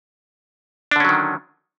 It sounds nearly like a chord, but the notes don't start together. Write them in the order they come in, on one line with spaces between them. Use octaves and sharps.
D4 D3 C#4 F#3 D#3